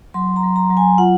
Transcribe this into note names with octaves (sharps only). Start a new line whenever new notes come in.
F#3 C6
A#5
F#3
A#5
F#3
G#5
F4 F#5